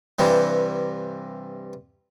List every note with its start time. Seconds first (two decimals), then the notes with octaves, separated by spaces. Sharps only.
0.19 G2 C3 E3 G3